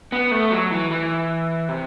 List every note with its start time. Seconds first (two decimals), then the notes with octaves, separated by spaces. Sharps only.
0.12 B3
0.31 A3
0.51 F#3
0.71 E3
0.91 E3
1.69 C3